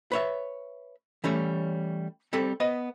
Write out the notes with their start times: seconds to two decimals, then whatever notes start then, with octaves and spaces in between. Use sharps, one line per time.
0.12 B4 C#5 E5
1.24 E3 G3 A3 C#4 C#5
2.33 G3 C4 A4 B5
2.60 B3 B4 D#5